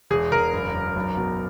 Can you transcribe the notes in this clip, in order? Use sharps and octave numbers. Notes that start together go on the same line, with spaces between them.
E1 G#4
E1 A#4
F#1
F#1
B1
B2